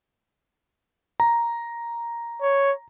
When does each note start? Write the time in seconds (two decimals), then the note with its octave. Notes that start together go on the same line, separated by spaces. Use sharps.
1.20 A#5
2.42 C#5